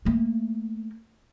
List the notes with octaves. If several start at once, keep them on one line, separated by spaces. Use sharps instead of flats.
A3 A#3